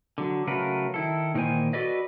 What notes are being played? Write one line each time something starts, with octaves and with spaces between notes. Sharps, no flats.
D3 F#3
C#3 F#3 A3 A#4 B4
D#3 E4 A4
A#2 D#3 E3 C5 G#5
F#4 A4 B4 D5 D#5